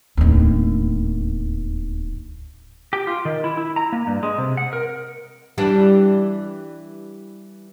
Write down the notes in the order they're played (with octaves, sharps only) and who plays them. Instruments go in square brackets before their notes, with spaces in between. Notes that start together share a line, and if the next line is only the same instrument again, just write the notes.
[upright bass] D1 D#2
[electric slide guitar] G4
F4
D#3
E4
E4
A#5
A#3
G2
G#3
C3
F#5
A#4
[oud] E3 G3 D4